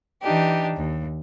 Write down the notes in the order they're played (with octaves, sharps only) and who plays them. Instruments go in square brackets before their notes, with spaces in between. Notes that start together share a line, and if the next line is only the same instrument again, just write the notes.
[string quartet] E3 D4 D#4 G4
D#2